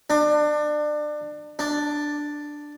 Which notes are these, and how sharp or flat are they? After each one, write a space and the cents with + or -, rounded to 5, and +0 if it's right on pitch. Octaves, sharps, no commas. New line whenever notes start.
D4 +30
D4 +5